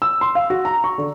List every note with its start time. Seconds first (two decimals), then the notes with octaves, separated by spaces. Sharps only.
0.02 E6
0.21 C6
0.35 F5
0.50 F#4
0.65 A#5
0.84 C#6
0.98 D3